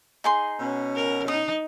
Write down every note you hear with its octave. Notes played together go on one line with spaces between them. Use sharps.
D#4 G#4 C6
B2 C#4
A#4
D#4 D#6